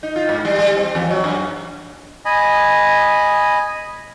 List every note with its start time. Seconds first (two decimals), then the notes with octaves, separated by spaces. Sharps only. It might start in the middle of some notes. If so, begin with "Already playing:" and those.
0.03 D#4
0.16 F4
0.29 G#2
0.45 G3
0.59 G3
0.77 C4
0.95 E2
1.10 F#3
1.24 F#2
2.25 D#5 G#5 B5